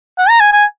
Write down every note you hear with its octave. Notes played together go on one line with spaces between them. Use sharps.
F#5
A#5
G#5
G#5